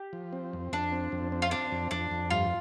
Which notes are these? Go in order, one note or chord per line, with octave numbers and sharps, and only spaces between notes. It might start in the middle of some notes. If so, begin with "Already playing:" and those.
Already playing: G4
F3
C4
F2
F2 D4
C4
F2
C4
F4
C4 D4
F2
F2 D4
F2
G2 F4